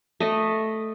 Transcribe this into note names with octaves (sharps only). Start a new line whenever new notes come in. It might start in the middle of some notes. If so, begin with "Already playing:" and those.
A3 D#5